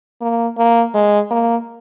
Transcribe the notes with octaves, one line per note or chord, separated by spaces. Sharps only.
A#3
A#3
G#3
A#3